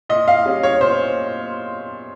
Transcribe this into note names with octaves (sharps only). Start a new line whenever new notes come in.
A#2 D#5
F5
G3 C#4
C#5
A#2 C5